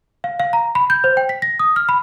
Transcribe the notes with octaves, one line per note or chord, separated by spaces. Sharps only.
F5
F5
A#5
B5
G6
C5
G5
B6
A#6
D#6
F6
B5